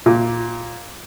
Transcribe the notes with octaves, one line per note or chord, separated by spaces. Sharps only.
A#2